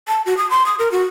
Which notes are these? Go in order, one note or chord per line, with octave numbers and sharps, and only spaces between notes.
A5
F#4
D#6
C6
D#6
A#4
F#4